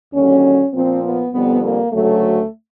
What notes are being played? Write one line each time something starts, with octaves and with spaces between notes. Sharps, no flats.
D#2 D3 F#3 C#4
A#2 F3 C4
B3
F2 D3 G3 B3
A#3
D2 C#3 F#3 A3